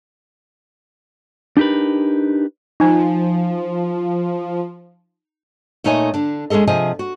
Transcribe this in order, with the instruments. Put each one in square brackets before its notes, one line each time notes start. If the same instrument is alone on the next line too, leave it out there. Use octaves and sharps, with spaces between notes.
[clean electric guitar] D4 D#4 G4 A#4 B4
[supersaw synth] F3 [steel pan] D#4 G#5
[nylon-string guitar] A#2 A3 D#4 C#5 D#5 G#5
D3 D4
G#3 C#4 G#4 A4 D#5
C3 F3 G#4 D#5 G#5
F#4